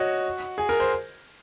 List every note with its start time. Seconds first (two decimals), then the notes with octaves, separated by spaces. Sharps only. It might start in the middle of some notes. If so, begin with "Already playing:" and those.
Already playing: F#4 C#5 D#5
0.58 G#4
0.69 A#4
0.80 C5